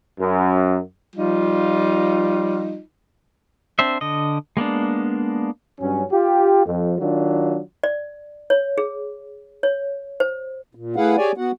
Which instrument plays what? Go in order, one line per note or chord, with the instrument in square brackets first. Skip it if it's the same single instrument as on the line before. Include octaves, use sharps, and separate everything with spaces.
[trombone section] F#2
[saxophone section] F3 G3 D#4 F4
[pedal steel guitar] C4 D4 C5 E5
D3 D#5
G#3 A#3 B3 D4
[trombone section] G2 F#3 C#4
F4 G4
F2
D#3 F#3 D4 F4
[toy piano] D5
C#5
G#4
C#5
C5
[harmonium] A#2
A3 E4 G#4 B4 F5 F#5
G4 G#4 C#5 D5 G#5
B3 F#4 F#5